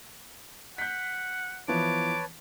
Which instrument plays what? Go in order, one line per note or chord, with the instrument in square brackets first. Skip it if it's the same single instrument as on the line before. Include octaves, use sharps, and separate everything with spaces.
[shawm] F#5 [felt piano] G6 B6
[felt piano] E3 F3 B3 [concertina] B4 C#5 A5 [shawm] D6